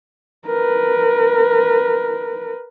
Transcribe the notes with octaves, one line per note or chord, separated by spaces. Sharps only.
A#4 B4